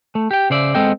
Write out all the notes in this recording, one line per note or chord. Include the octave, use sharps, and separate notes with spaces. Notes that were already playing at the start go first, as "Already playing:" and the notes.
A3
G4 G5
C#3 C5 D5 E5
G#3 B3 C4 A4 D#5 G5